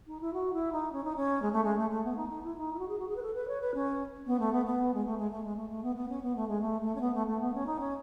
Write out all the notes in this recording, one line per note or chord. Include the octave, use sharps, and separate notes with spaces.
D#4
E4
F#4
E4
D#4
C#4
D#4
C#4
G#3
A3
G#3
A3
A3
B3
D#4
D#4
E4
D#4
E4
F#4
G#4
F#4
G#4
B4
A4
B4
C#5
B4
C#4
B3
A3
B3
B3
G#3
A3
G#3
A3
G#3
A3
A3
B3
B3
C#4
B3
A3
G#3
A3
A3
C#4
B3
A3
A3
B3
C#4
D#4
C#4